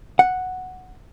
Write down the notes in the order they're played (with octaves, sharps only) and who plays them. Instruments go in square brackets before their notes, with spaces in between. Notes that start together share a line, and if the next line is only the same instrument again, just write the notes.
[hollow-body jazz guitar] F#5